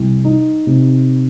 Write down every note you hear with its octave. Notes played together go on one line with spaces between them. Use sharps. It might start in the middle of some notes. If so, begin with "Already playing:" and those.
Already playing: C2
D#4
C3